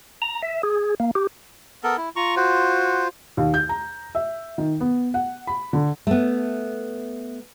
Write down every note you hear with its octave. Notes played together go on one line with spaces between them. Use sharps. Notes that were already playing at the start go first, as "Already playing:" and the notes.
A#5
E5
G#4
A#3
G4
B3 A4 A#4
E4
F4 A#5 C#6
F#4 C5
D#2
G6
A#5
E5
D#3
B3
F#5
B5
D3
A3 B3